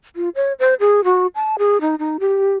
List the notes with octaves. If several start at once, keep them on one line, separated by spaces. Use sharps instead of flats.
F4
C#5
C5
G#4
F#4
A5
G#4
D#4
D#4
G4